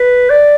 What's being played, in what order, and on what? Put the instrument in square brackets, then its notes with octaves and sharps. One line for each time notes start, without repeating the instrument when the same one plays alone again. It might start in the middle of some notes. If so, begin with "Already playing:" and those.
Already playing: [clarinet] B4
D5